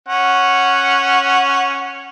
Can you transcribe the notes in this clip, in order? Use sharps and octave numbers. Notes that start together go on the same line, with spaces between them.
C#4 F#5